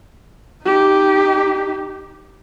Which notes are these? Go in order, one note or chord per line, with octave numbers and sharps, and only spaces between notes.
D#4 G4